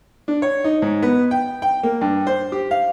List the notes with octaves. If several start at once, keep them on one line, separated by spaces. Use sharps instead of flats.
D4
C#5
D#4
G#2
B3
G5
G5
A#3
G2
C5
G4
F5